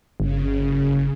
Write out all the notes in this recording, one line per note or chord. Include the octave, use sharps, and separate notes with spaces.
G1 C#3